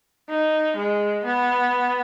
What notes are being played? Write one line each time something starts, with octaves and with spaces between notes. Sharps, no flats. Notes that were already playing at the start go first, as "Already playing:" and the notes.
D#4
G#3
B3